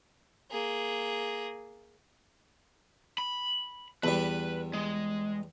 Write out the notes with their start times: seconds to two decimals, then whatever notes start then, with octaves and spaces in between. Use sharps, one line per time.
0.51 A#3 G#4
3.18 B5
4.04 E2 G3 B4
4.73 G#3